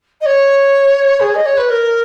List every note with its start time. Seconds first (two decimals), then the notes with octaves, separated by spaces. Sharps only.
0.20 D#5
0.25 C#5
1.19 G#4
1.34 D#5
1.45 C#5
1.57 B4
1.68 A#4